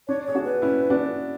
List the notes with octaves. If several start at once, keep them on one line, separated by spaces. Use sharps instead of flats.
D4 C#5
G#4 C#5
D4 F#4
B4
C#4 E4
D4 F#4